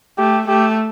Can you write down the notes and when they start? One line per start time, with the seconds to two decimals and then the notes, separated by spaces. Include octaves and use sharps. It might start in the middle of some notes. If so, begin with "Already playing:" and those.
0.18 A3 G4
0.47 A3 G4